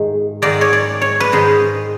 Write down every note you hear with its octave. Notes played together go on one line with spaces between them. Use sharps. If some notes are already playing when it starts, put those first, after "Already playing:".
Already playing: G#2 D#3 G#3
G#2 D#3 G#3 D5
C#5
D5
C#5
B4
G#2 D#3 G#3 C5